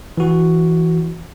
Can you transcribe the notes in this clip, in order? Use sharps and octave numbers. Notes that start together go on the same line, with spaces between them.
E3 F#4